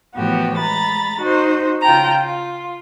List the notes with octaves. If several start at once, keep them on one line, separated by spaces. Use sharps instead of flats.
A2 E3 F3 B3 F#4 G4
G#3 A#5 B5 A6
D#4 F#4 C5
C#3 F4 G5 A5 A#5
F4